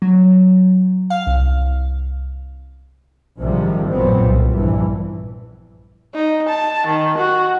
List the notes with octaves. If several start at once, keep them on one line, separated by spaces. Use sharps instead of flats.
F#3
F5
C2
A#1 G#2 C3 D#3 F3 G3
A1 F#2 A#2 F#3 B3 C4
C2 A#2 G3
A#1 G2 E3
D#4
A5
D#3
F#4